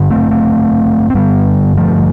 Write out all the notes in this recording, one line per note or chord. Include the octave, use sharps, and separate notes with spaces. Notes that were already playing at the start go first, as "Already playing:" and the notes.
Already playing: G2 D3
A3 C4
A3 C4
C4
G2 D3 G3 B3
F3 A3